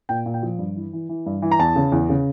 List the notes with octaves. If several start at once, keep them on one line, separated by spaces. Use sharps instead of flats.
A#2 G5
A#2
G5
F3
G2
E3
E3
E3
G2
E3
A#5
E2 A5
C#3
E2
C#3